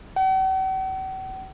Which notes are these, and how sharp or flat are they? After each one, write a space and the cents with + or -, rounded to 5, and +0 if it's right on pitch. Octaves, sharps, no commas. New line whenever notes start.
F#5 +45